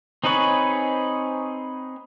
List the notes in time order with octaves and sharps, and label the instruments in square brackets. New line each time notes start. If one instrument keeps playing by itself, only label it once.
[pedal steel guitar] C4 D#4 G#4 B4 C#5